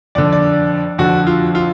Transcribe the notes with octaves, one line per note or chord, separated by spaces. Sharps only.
F2 D3 D5
D5
F2 D3 F#4
F4
F4